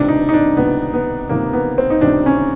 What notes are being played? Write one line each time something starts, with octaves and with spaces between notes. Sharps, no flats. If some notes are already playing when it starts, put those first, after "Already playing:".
Already playing: C#2 C3 D#3 D4
D#4
D#4
D4
C#2 C3 D#3 B3
B3
C#2 C3 D#3 A#3
B3
C4
D#4
C#2 C3 D#3 D4
C#4